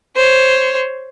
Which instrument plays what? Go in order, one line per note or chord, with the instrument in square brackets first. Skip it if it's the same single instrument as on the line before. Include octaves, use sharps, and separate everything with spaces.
[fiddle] C5 C#5